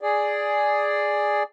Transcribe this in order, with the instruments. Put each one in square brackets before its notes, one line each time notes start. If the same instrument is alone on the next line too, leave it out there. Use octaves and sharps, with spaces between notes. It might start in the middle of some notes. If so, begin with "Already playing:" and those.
[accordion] G#4 D5